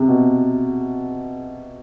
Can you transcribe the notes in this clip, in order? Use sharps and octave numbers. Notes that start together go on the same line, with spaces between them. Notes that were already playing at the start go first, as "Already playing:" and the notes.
Already playing: C3
B2